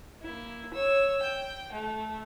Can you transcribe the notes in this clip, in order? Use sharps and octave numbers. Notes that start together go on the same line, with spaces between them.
A#3 E4
C#5 E6
G5
A3